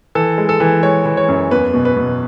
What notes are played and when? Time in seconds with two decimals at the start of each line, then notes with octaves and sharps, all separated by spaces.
0.15 E3 A4
0.38 G#3
0.49 A4
0.60 E3
0.83 G#3 C#5
1.06 E3
1.17 C#5
1.29 F#2
1.51 E2 B4
1.74 B2
1.85 B4
1.97 B2